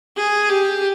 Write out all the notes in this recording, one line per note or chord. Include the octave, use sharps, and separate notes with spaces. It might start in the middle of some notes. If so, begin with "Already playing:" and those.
G#4
G4